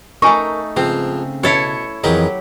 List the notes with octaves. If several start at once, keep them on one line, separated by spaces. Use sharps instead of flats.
A3 D#4 A#4 G#5 C#6
G#2 C#3 F3 C4
B2 E4 A4 C#5
F2 E3 F#3 G4 G#4 A#4 D#5